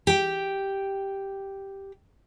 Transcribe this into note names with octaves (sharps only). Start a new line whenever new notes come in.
G4 G5